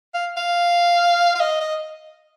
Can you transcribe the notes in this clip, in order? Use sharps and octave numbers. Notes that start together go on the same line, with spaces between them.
F5
F5
F5
D#5
D#5